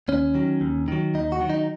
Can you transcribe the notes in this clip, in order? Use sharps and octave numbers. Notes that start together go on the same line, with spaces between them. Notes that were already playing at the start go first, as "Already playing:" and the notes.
D#2 C#4
D#3 F#3
D#2
D#3 F#3
D#2 D#4
F#4
D#3 F#3
D#4